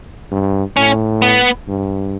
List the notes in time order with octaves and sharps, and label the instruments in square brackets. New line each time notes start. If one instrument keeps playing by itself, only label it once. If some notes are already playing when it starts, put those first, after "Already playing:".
[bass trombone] G2
[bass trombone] A2 [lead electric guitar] C#4
[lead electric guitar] B3
[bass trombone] G2